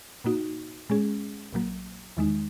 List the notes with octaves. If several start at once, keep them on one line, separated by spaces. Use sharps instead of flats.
A#2 A#3 D#4 F#4
A#2 G#3 C#4 G#4
A#1 A#2 F#3 A#3
E2 D#3 G#3 D#4